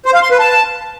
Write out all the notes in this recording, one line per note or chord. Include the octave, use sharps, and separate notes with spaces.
C5
F5
C6
B4
A5